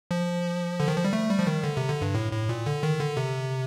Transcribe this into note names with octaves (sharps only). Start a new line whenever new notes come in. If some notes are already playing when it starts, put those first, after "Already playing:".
F3
D3
D#3
F3
G3
A3
G3
F3
D#3
D3
C3
D3
G2
A2
A2
A#2
D3
D#3
D3
C3